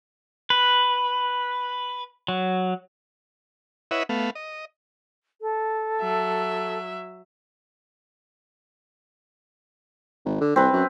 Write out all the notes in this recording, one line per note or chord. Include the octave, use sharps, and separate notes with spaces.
B4
F#3
E4 B4 C#5 D#5 E5 F#5
A3 B3 F5
D#5
A4
F#3 E5
G#1
D3
C2 C4 B4
F#2